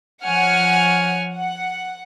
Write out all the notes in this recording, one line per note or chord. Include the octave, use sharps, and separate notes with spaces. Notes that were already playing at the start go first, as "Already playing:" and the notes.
F3 C#5 F#5 G#5 F6 C#7
F#5